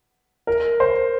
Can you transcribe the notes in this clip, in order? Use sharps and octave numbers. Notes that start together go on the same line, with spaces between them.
A#4
C5